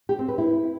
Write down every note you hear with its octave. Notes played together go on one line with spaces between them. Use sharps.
G4
C4
B4
E4